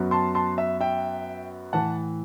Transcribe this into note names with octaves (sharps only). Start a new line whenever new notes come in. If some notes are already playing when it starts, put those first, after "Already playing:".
Already playing: F#2 F#3 B3
A5 C6
A5 C6
E5
E5 G5
A2 E3 F#5 A5